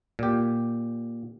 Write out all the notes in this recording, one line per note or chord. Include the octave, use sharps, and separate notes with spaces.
A#2 G4